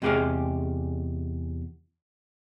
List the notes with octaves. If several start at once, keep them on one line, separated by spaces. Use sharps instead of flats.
E2 C3 G#3 G4 G#4 F5